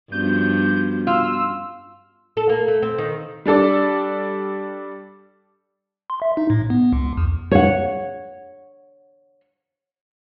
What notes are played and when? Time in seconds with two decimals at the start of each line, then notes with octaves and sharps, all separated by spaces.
0.12 G2 F3 B3 C#4 F#4 G6
1.07 F4 E6
2.37 A4
2.49 A#3
2.68 A3
2.82 C4
2.98 D#3
3.46 G3 D4 A4 D5
6.10 C6
6.22 E5
6.37 D#4
6.50 A2
6.70 B3
6.93 C#2
7.17 E2
7.51 C#5 F#5